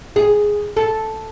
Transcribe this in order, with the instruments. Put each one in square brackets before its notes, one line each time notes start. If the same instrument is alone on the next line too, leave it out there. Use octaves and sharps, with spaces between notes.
[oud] G#4
A4